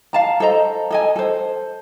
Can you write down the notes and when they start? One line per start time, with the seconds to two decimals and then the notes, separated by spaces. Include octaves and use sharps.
0.13 F5 A5 A#5
0.40 A4 C5 D#5 A#5
0.91 A4 D#5 G#5
1.16 A4 C5